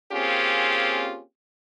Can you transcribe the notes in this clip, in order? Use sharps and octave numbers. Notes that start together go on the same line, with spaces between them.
A#3 C4 C#4 F4 G4 G#4